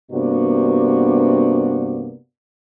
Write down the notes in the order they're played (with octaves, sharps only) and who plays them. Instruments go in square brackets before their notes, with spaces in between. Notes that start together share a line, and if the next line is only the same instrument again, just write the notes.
[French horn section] G2 C3 A#3 B3 D4 F#4